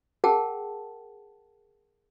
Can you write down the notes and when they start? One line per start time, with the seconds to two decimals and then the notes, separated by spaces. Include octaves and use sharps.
0.24 G#4 A#4 F#5 G5 A5